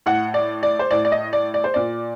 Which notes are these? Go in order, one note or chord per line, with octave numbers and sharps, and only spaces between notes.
A2 F#5
D5
D5
C5
A2 D5
D5
D#5
D5
D5
C5
A#2 D5